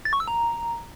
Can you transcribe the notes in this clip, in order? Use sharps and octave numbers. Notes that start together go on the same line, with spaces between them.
A6
C#6
E6
A#5